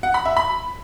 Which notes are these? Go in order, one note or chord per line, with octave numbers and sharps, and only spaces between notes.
F#5
B5
E5
B5